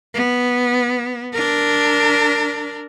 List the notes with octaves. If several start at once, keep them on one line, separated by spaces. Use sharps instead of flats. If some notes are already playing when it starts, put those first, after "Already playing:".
B3
D4 A#4